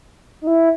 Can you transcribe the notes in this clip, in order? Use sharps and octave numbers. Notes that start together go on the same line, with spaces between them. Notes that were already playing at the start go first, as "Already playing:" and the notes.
D#4
E4